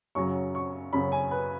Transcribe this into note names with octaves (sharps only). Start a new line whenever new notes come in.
F#2 C#3 F#3 C#6
C#6
F#2 C#3 F#3 B5
G#5
B4